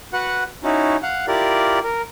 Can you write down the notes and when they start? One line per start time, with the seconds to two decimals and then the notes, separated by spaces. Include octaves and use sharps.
0.13 F#4 B4 F#5
0.64 C#4 D#4 E4 F#4
1.03 F5 F#5
1.27 E4 F4 G4 A#4 D5
1.84 A#4